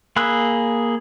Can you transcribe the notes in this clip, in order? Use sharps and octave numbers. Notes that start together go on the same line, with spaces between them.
A#3 G#4 B5 E6 F#6